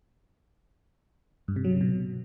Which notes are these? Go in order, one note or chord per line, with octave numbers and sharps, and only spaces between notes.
G2
C3
F#3
C#3
B2